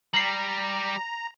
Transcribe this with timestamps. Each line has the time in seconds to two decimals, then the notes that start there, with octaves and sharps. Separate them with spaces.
0.14 G3 A#5 C7 F#7